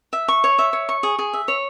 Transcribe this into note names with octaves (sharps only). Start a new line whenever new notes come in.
E5
C#6
C#5
E5
C#5
C#6
G#4
G#4
E5
C#5